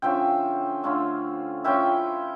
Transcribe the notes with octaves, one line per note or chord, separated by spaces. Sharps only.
D3 F3 C#4 E5 G5
D3 A3 C#4 F4
F3 C#4 E4 E5 G5